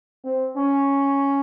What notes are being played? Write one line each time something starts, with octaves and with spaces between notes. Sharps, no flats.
C4
C#4